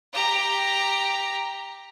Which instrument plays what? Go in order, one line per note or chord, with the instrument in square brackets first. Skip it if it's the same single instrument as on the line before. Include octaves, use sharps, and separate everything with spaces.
[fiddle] G4 A#5